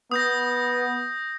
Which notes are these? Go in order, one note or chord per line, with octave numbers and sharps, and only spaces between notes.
B3 D#6 G6 A#6